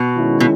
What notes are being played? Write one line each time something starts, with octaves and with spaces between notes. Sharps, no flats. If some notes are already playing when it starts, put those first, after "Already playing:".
Already playing: B2
D#3 G#3 C#4 E4
B2